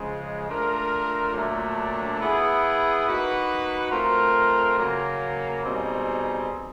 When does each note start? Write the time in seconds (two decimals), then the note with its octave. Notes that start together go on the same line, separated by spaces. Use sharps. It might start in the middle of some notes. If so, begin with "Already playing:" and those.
Already playing: C#3 F3 G#3
0.48 A3 D4 F4 A#4
1.34 A#2 F#3 A3 D4
2.19 B3 E4 G#4
3.06 A#3 D#4 F#4 B4
3.91 A3 C4 F4 A#4
4.78 C#3 F#3 A#3
5.63 B2 G3 C4 D#4 G#4